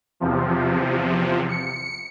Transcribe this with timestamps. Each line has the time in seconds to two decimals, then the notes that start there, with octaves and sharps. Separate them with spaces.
0.20 E2 C3 F3
1.49 C#7